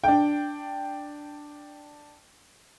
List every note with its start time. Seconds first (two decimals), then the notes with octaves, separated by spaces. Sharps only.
0.04 D4 G5